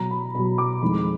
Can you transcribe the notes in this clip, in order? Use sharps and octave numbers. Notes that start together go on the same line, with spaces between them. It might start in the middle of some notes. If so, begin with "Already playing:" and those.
Already playing: B2 F#3 A#5
B5
B2 F#3 B5
D6
F2 D#3 G#3 B5